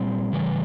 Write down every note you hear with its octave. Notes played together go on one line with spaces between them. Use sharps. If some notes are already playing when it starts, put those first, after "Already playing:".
Already playing: A#2 G3 C4
C#3 E3 G3